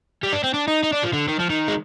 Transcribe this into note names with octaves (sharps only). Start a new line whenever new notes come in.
G3
D4
C4
D4
D#4
D#4
D4
F3
D3
D#3
F3
D#3
G#3